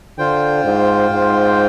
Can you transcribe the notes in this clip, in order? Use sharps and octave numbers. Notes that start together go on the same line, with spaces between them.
D3 F4 C5 G5
G#2
G#2